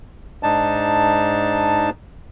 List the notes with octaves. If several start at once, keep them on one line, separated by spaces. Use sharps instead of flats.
G#2 D4 D#4 A5